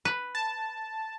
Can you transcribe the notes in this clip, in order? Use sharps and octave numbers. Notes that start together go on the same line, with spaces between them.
B4
A5